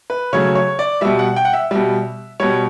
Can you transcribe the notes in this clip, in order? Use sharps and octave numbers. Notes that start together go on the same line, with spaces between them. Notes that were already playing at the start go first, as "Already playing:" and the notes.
B4
C#3 F#3 A3 C#5
C#5
D5
B2 G3 E5
F#5
G5
F#5
E5
B2 G3
B2 G3 C#5